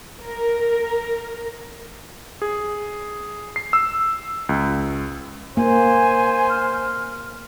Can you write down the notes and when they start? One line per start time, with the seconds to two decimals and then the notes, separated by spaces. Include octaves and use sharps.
0.22 A#4
2.42 G#4
3.56 C7
3.73 E6
4.49 C#2
5.57 A#3 C5 G#5
6.50 F6